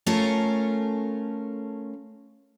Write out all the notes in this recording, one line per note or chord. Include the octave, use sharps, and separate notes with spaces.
A3 C#4 F4 A4 A#4